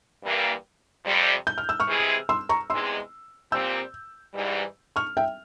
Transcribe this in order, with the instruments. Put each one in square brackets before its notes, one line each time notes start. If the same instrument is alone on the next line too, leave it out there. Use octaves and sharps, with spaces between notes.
[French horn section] G2 E3 A#3
F2 C3 G3
[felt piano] G6
F6
E6
C#6 F6
[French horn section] C3 E3 G#3 E4 G#4
[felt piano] C6 E6
A#5 C#6
[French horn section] E2 C3 E3 G#3 [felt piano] C6 E6
[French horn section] A#2 G3 C4 [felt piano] E6 G6
[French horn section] G#2 E3 G3
[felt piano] C#6 F6
E5 G5